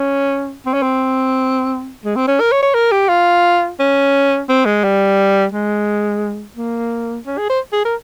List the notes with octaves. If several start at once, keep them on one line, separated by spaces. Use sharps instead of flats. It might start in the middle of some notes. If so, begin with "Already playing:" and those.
Already playing: C#4
C4
C#4
C4
G#3
C4
C#4
A#4
C#5
C#5
A#4
G4
F4
C#4
C4
G#3
G3
G#3
A#3
C#4
G#4
C5
G#4
A#4